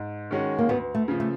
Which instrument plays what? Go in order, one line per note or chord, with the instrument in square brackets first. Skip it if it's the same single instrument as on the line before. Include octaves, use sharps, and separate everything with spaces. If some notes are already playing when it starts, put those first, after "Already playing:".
Already playing: [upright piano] G#2
D#3 G#3 C#4 F#4
[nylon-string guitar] A#3
[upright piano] D2 [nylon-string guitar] B3
[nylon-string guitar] A3
[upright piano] C#3 F3
[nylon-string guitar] A3